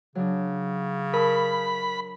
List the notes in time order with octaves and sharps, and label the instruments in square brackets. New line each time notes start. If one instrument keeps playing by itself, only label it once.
[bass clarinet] C#3 [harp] F#3 D4
[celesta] A#4 [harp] A5 E6 [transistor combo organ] B5